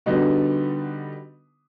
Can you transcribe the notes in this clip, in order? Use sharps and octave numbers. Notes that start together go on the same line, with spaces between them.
D3 G3 B3 D#4 F#4